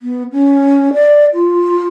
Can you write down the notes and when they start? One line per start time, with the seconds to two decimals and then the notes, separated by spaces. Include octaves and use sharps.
0.02 B3
0.33 C#4
0.94 D5
1.34 F4